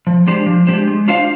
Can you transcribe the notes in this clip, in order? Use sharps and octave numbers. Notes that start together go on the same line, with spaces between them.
F3
G#3 D4 G4 C5
F3
G#3 D4 G4 C5
G#3
D4 F4 C5 F5